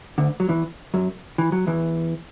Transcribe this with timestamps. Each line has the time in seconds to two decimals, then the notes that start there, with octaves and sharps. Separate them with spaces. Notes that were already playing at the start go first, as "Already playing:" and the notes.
0.18 D2 D3
0.40 F#3
0.49 E2 E3
0.94 F#2 F#3
1.38 E3
1.52 F#3
1.67 E2 E3